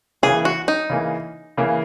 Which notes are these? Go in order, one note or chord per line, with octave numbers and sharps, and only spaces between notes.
C#3 E3 A#3 G#4
F#4
D#4
C#3 E3 A#3
C#3 E3 A#3